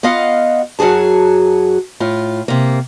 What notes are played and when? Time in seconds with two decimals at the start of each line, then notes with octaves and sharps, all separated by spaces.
0.03 B3 F4 D#5 F5 F#5
0.79 F#2 F#3 F#4 G#4 A5
2.00 A2 F4
2.48 C3 A#3